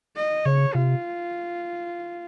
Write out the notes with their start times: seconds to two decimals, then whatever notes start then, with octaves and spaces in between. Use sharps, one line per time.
0.16 D#5
0.45 C#3 C#5
0.74 C3 F4